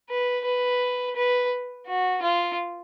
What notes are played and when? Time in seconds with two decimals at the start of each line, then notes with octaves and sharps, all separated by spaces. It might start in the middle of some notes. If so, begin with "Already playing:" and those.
0.10 B4
0.45 B4
1.16 B4
1.87 F#4
2.22 F4